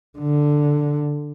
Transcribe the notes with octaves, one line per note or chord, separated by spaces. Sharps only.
D3